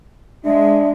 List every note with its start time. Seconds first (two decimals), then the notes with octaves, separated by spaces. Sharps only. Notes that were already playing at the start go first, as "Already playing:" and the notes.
0.45 G#3 D4 E5